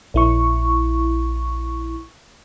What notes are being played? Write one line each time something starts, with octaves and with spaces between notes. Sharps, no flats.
A#1 E4 C#6